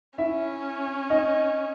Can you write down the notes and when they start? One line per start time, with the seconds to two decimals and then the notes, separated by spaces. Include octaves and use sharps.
0.18 C#4 E4 E5
1.10 D#4 D#5